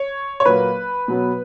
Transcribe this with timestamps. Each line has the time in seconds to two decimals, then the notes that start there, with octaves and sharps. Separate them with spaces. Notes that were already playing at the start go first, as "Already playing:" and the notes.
Already playing: C#5
0.40 C#5
0.45 A#2 F#3 A#3 B4
1.08 B2 F#3 B3